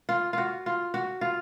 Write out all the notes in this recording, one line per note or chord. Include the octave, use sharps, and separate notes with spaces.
F4
F4 F#4
F4
F#4
F4